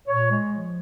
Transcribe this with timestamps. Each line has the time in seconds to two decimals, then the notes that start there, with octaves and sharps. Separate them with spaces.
0.08 A#2 C#5
0.30 G#3
0.51 F3